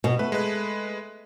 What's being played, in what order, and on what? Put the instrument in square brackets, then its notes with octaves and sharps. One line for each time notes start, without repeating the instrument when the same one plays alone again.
[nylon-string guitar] B2
[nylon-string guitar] A3 [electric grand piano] B4
[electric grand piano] G#3 B4